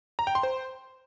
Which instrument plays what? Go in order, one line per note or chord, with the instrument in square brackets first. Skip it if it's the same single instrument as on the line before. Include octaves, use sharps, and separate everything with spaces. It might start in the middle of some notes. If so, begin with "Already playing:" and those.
[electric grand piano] A#5
G5
C6
C5